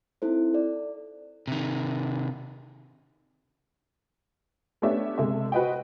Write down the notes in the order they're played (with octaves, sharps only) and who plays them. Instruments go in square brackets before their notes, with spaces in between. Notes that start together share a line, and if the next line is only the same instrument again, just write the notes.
[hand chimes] C4 D#4 E4 A4 C5
A4 D5
[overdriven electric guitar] C3 D#3
[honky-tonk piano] A3 B3 C#4 D4 G4 E5
C3 G#3 A4 E5
F#4 B4 C5 D#5 F#5 G5